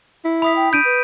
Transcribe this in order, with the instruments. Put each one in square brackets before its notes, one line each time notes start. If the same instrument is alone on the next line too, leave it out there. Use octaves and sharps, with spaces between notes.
[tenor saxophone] E4
[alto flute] E5 [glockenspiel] B5 D#6 B6
[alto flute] G5
[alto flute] D4 [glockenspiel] G6 D7 D#7
[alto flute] B4